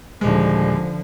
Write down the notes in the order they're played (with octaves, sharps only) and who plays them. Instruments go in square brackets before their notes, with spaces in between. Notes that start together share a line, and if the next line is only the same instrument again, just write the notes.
[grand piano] D#1 G#3 [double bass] D3 F3